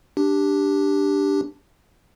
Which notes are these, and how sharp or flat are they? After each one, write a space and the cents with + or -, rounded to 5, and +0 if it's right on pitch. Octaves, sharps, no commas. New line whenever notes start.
D4 +0 G4 +0